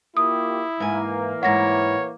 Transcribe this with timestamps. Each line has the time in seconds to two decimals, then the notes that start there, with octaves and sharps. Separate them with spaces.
0.17 A#3 E4 F4 G4 D#6
0.80 G#2 E3 A#3 G#5
1.43 G#2 E4 C#5 F#5 A#6